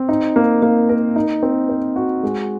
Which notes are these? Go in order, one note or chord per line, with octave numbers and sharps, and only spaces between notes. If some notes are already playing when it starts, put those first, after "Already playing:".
Already playing: C4
D#4
A#3
A#3
A#4
D#4
C4
C5
F#4
G#3